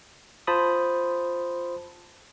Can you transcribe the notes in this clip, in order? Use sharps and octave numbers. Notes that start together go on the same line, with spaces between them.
F4 C5 A5 B5 D#6